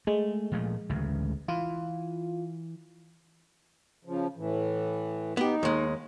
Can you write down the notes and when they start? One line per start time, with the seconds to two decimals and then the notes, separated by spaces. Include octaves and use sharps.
0.07 G#3 A3
0.52 A#2 F3 A3
0.90 A1 D2 C#3
1.48 E3 F4
4.05 C#3 F3
4.37 A2 E3
5.37 B3 D#4 G4
5.63 D#2 G#3